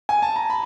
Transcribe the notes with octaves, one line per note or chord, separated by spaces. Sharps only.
G#5
A5
A#5
B5